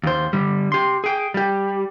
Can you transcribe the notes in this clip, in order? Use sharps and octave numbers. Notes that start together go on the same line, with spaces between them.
D#2 C5
D3 G3
G4 C6
G#4 G5
G3 G4